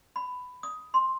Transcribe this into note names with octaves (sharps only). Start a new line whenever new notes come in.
B5
D#6
C6